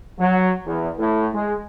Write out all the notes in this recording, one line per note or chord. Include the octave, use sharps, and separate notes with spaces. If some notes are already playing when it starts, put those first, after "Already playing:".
F#3
E2
A2
G#3